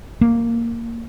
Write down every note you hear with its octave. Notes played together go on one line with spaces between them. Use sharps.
A#3